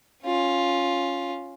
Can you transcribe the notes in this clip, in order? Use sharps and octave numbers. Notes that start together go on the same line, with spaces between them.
C#4 F4